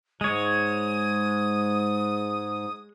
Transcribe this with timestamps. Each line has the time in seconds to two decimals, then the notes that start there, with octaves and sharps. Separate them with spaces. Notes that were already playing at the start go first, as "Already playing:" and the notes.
0.21 G#2 G#3 C#5 D#6